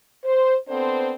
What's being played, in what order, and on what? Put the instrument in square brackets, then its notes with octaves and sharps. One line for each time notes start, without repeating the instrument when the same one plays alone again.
[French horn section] C5
B3 C4 D4 A4 C5